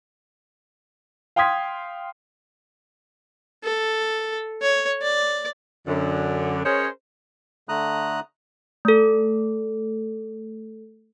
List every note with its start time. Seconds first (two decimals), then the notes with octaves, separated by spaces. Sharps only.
1.36 F5 G5 C6 D#6 G#6 B6
3.63 A4
4.62 C#5
5.02 D5
5.87 F#2 D3
6.64 C#4 G#4 A#4 C5 C#5 D#5
7.69 D3 A3 A#5 D#6 F#6
8.85 A3 A4